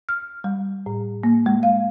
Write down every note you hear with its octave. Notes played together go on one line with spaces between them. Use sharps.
F6
G3
A2
A#3
G#3
F5